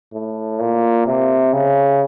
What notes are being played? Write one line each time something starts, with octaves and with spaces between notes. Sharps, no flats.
A2
A#2
C3
C#3